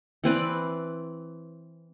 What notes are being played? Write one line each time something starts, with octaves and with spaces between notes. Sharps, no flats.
E3 C4 B4 D5